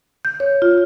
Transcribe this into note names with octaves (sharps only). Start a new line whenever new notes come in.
G6
C#5
F4